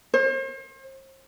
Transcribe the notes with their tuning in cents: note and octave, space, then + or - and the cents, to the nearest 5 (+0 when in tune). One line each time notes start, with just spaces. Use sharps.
C5 +40